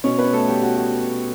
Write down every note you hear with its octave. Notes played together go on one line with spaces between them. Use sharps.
B2 C#4 C#5
B3 B4
A3 A4
G3 G4
F#4
F#4